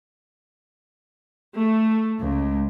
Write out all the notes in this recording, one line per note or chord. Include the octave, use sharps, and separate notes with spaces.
A3
C#2